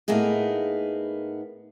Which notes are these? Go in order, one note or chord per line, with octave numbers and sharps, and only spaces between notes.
A2 A#3 B3 D#4 G#4